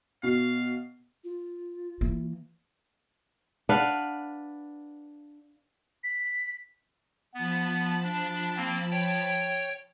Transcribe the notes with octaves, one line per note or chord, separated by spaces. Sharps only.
B2 F5
F4
E3 A#3
D4 B4 F5 F#5
B6
F3 B3 A5 B5
D4
A#3 C4
C#5 G5